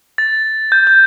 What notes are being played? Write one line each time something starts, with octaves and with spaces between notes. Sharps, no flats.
A6
G6
G6